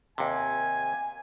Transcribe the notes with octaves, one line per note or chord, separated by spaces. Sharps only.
D#2 C3 G#5